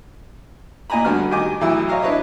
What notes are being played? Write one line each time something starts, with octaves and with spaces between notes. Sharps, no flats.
A#2 D#5 G#5 A#5 B5
G2 D3 B3 D4 F#4 F6
D#3 G4 D#5 G#5 D6
B1 A2 E3 F#3 E4 E6
C#5 D#5 F5 A#5
D4 E4 B4 C#5 D#5 E5